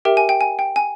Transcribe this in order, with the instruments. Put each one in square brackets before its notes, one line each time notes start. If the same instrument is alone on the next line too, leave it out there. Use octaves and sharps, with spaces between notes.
[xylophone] G4 A#4 E5 G5
G#5
G5
G#5
G5
G#5